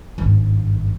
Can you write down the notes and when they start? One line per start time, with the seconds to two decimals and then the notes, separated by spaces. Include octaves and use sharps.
0.18 G#1 G2